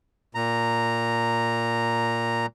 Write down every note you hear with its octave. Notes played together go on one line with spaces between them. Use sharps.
A#2 A#5